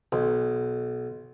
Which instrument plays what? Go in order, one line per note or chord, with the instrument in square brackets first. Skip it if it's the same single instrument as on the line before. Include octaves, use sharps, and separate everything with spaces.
[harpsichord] B1